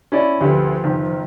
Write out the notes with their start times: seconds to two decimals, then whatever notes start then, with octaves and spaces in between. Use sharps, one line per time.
0.12 C#4 E4 D5
0.41 D2 D3 F3 G4 B4
0.84 F#1 D#3